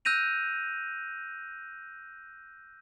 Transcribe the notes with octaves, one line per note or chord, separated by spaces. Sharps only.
E6 F#6 G6 A#6 D#7 F7